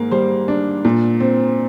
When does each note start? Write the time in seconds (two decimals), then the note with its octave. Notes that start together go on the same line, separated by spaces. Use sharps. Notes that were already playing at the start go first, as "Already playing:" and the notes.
Already playing: G#2 A#3
0.11 G3 C5
0.48 D4
0.85 A#2
1.20 C4